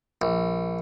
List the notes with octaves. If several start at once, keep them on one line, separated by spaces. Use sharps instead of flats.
A#1